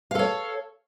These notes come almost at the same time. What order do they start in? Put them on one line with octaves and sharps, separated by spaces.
F5 A4 C#5